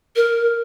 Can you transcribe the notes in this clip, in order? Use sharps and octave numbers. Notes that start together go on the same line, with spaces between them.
A#4